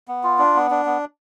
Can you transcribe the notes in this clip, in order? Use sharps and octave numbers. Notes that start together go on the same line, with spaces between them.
B3
F4
D4
B3
D4
B3